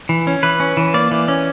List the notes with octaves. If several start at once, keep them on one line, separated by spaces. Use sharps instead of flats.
E3
C#4
E3 B4
C#4
E3
A#3 D5
E3
C#4